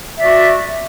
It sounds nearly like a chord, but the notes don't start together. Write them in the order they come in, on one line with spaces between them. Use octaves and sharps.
E5 D5 F#4